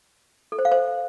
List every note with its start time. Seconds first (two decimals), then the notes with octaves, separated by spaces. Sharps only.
0.52 A4
0.59 C5
0.65 F5
0.72 C5